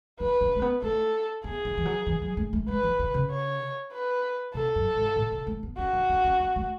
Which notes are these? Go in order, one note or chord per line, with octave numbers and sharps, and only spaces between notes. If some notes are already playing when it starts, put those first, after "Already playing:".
C#4 B4
C#4
A3
B3
A3 A4
B3 G#4
D4
E3
F#3
E3
F#3
A3
A3
G#3 B4
E3
D3
C#3
C#5
B4
B2 A4
F#2
G#2
A2
B2
A3
B3
C#4 F#4
D4
C#4
C#4
B3
A3